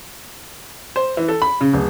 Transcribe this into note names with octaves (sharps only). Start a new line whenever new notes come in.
C5
E3
A4
B5
C#3
D1